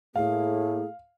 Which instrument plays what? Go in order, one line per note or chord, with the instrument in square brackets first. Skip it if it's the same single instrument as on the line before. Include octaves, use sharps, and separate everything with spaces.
[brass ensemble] A2 A#3 [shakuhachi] G#4 [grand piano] F5